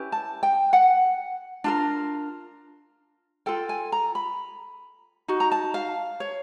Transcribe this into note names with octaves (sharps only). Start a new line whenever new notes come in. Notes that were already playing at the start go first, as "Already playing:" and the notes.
Already playing: C#4 E4 G4 B4
A5
G5
F#5
D4 F4 A#4
F4 A4 G5
G#5
A#5
B5
D#4 F#4
A#5
A5
F5
C#5